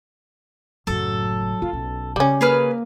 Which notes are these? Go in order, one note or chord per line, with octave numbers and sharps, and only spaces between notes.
F#1 A2 F#3 A4
D#3 F4
B1 C#4
C#3 G3 C#4
A#3 G#4 B4 F6